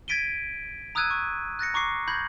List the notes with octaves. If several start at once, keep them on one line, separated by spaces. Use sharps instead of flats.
G#6 A6 B6 D7 D#7 G7
A#5 D#6 E6 F#6 G#6 D#7
C#6
F#6 A6 A#6 C#7
A#5 C#6 D6 C7
B5 G6 G#6 A#6 F#7